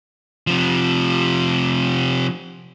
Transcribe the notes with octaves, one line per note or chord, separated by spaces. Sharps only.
C3 F3